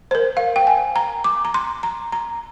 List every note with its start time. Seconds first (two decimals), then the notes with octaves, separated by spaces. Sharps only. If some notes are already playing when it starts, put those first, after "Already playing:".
0.11 C5
0.15 A#4
0.37 F5
0.56 G5
0.67 G#5
0.96 A#5
1.24 D6
1.45 A#5
1.54 C6
1.83 A#5
2.12 A#5